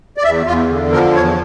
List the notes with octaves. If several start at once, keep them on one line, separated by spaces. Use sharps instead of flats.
D5
E2 E5
E2 F4
D3
F3 A#4
E2 C#5